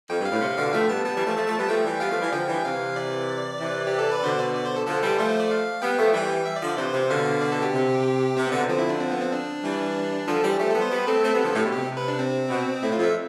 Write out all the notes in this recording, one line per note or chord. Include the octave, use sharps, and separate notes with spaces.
F2 G5
G2
F5
A2
C3
B2 D3
F3 A3 G5
G3 B3 A5
G3 B3 A5
E3 G3
F3 A3
F3 A3
F3 A3
G3 B3
A5
F3 A3 G5
E3 G3
G3 B3 F5
F3 A3
E3 G3
D3 F3 G5
E3 G3
C3 E3 F5
D5
C3 E3
G4
A4
B4
B2 D3 C5
D5
D5
C5
A4
D3 F3 A4
E3 G3
F3 A3 C5
C5
D5
F5
G3 B3 G5
F3 A3
E3 G3 G5
E5
D5
D3 F3
D5
C3 E3 C5
C3
B2 D3 F5
D5
A4
G4
C3
C3 C4
B3
B2 D3
C4
D3 F3 C4
E4
D4
C4
B3
C4
D4
E3 G3
D3 F3 A4
E3 G3 G4
F3 A3 G4
A4
G3 B3
C5
G3 B3 B4
A3 C4 A4
A3 C4
G3 B3
D3 F3
A2 G4
B2
C3 G4
B4
D4
C4
B2
A2 E4
F4
F2
E5